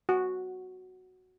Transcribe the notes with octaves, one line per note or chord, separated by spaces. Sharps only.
F#4